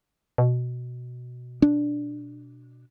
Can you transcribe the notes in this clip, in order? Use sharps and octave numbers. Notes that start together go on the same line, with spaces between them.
B2
D4